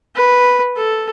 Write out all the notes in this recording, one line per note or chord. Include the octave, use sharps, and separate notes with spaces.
B4
A4